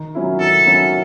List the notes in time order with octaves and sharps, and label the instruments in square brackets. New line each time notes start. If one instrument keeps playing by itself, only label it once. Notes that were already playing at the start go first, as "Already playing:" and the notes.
Already playing: [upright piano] D#3
F#3 C#4 E4
[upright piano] D#3 [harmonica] A4
[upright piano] F#3 C#4 E4